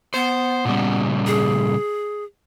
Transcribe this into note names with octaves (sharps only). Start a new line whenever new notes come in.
B3 C5
A#2 C#3 G3
G#4